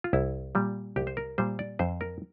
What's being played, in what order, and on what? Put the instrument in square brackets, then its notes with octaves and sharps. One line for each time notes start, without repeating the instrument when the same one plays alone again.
[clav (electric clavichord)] F4
C2 E4
A#2 G3
C2 G4
C5
A#4
A#2 G3 C5
D5
F2 C5
A#4